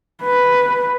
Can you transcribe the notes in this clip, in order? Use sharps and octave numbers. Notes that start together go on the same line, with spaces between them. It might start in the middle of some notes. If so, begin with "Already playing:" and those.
B4